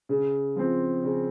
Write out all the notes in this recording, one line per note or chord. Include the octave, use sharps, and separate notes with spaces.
C#3
F3 C4
C#3